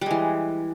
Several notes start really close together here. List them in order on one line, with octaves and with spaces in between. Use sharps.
G3 G#3 E3